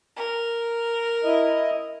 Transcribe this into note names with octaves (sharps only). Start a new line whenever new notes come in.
A#4
E4 D#5